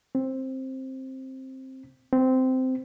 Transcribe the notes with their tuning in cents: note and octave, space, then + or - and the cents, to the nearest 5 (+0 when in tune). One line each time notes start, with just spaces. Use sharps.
C4 +10
C4 -15